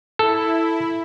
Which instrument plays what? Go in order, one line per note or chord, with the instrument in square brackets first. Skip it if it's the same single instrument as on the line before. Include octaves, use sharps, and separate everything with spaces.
[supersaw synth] E4 [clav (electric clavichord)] A4